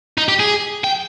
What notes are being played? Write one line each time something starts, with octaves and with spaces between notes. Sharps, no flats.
D#4
G4
G#4
G5